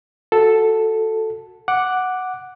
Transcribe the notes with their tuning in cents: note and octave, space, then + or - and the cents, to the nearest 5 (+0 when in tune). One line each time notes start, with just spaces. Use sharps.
F#4 -10 A4 +0
F#5 +0 D6 +0